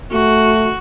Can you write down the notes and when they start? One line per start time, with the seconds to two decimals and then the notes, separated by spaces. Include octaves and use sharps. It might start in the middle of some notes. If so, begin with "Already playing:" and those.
0.12 A3 F#4